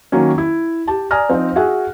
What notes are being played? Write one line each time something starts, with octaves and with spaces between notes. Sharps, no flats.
D#3 F#3 A#3 C#4
E4
G4 A5
D5 G#5 A#5 D#6 F6 A#6
F3 C4 D#4
F#4 G#4 E5 G#5 F#6